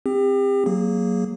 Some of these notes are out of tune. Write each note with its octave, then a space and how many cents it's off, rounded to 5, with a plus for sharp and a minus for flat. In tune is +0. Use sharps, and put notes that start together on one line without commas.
C4 +0 G4 +35
F#3 +0 A#3 +0 G#4 +0